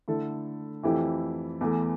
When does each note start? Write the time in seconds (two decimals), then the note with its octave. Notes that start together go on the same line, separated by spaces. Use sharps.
0.08 D3 A3 E4 A4
0.83 F2 E3 A3 E4 G4
1.61 E2 E3 A3